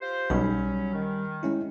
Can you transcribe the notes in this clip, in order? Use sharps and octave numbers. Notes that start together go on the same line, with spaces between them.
F4 G4 C5
B1 F#3 G3 C#4 B5
D#3
G#3 C#4 E4